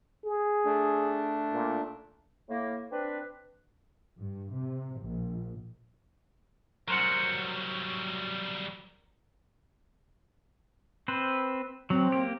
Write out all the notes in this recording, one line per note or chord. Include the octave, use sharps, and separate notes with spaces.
G#4
A3 D4
A#2
A2 A#3
C4 D4 B4
G2
C3
A#1
F#3 G3 A#4 C5 F#5
C4 B4 C5
F#3 C4
A#3 G4